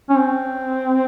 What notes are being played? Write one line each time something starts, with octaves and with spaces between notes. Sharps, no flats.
C#4
C4